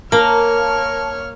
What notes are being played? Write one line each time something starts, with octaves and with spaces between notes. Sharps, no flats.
A#3 A#4 C#5 A5 F6